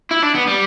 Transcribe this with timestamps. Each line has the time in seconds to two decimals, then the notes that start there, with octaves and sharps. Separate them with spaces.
0.11 E4
0.23 D4
0.35 B3
0.47 G3